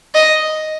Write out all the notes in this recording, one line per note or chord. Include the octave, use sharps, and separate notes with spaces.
D#5